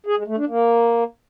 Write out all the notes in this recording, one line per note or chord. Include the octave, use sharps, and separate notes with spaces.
G#4
G#3
A3
D4
A#3